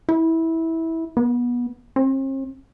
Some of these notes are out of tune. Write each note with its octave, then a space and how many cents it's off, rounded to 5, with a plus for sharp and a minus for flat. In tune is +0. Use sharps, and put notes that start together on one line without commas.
E4 -15
B3 -25
C4 +45